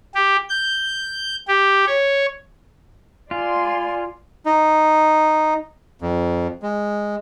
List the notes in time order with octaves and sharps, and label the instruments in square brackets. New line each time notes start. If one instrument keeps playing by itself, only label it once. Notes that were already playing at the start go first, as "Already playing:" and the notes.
[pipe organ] G4
G6
G4
C#5
[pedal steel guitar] F4 [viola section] D5 C6 [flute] G#5
[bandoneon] D#4
F2
G#3